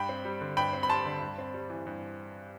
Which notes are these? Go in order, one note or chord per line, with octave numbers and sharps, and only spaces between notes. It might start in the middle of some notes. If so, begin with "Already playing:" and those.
Already playing: G2 G5 B5
C4
G3
D3
G2 G5 B5
C4
B5
G3 A5 C6
D3
G2
C4
G3
E3
G2